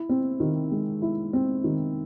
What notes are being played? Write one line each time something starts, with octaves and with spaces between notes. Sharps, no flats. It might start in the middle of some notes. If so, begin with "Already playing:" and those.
Already playing: E4
C4
D#3
G#3
E4
C4
D#3